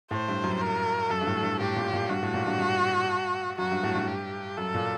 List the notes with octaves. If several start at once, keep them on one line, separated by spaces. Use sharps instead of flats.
A2 C5
G2
F#2
A#4
F#2 A4
G2
A2
G2
A2 G4
A#2
A#2
G2 F#4
A2
A#2
G2
G2
F#2 F#4
G2
A2
G2
G4
F#2 A4
A#2